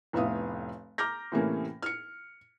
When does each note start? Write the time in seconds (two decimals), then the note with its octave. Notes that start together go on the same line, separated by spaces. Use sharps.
0.13 F1 A2 B3 E5 F5 D#6
0.98 A#5 D6 F6 G6 A#6
1.32 A2 C3 E3 A3 A#3 C#4
1.82 F6 C#7